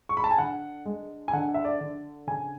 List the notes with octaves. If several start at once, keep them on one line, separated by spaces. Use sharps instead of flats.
C#6
B5
A5
G#5
D3 F#5
G#3
G#5
D3 F#5
E5
D5
D3
C#3 G#5